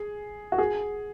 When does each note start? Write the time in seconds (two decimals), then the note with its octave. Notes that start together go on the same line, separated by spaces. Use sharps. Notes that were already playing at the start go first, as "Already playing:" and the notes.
Already playing: G#4
0.52 F#4
0.58 G#4